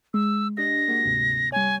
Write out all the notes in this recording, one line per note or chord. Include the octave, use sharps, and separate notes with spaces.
G#3 E6
D4 G4 D#5 A#6
G#3 A#3 F#4
D2 G#2 C3
G3 C#5 G#5